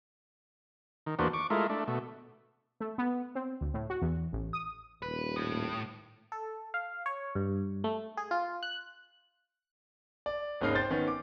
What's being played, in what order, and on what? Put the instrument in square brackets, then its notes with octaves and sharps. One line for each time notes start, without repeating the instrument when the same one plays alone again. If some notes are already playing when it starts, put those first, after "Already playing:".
[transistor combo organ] D#3
E2 A#3 B3 D4 F#4 C5
C#6 D6
G#3 A3 E4 F4 A#4
A3 D4
B2 A3
[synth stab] A3
B3
C4
D2
A2
F#4
E2
A1
D#6
[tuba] D#1 [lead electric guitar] B4
[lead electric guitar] A2
[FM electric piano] A4
F5
C#5
G2
A3
G#4
F4
F#6
[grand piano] D5
G#1 D#2 C#3 D#4 F6 C7
C5 G5 G6 A6
D#3 B3 C#4
D6